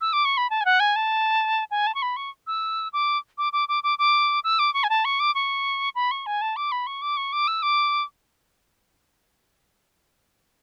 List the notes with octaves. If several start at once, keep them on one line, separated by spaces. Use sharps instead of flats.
E6
D6
C#6
B5
A5
G#5
F#5
G#5
A5
G#5
A5
C#6
B5
C#6
E6
D6
D6
D6
D6
D6
D6
E6
D6
C#6
G#5
A5
C#6
D6
C#6
B5
C#6
G#5
A5
D6
B5
C#6
D6
C#6
D6
E6
D6